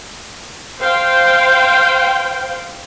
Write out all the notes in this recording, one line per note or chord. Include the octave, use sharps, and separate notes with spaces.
C5 F5 G5